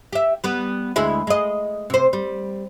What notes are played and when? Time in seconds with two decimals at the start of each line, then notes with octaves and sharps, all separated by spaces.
0.13 G4 E5
0.44 G3 B3
0.96 D2 G#3 E4
1.27 G#3 D#5
1.90 C3 C5
2.13 G3